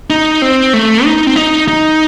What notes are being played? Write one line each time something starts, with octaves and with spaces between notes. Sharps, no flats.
D#4
C4
A3
D#4
C4
D#4
D#4